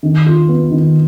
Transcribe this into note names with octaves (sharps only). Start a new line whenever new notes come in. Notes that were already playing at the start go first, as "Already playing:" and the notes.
D#3
F4
B3
D#3